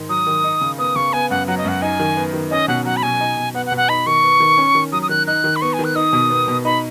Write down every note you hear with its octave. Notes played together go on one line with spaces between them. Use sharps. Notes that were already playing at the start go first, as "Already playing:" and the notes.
Already playing: G#2 D#3 D#4
F#3 D#6
D#3
D#4
C#3
B3 D#6
C#3 C#6
B3 G#5
F#2 F#5
F#3 F#5
D#5
F#2 F#5
D#4 G#5
D#3
B3
D#3
C#4 D#5
B2 F#5
F#3 F#5
B5
B2 G#5
D#4
B2
B3 F#5
F#5
B2
F#5
D#4 B5
D#3 C#6
B3
D#3
C#4
D#3
F#3 D#6
D#6
D#3 F#6
D#4 F#6
D#3
B5
B3 C#6
G#5
D#3
F#6
D#4 D#6
B2
B3
B2
D#4 B5